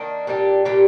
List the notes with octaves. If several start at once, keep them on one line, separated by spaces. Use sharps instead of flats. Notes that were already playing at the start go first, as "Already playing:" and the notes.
Already playing: D#3 A#3 D4
A#2 G3 D4 G4
A#2 G3 D4 G4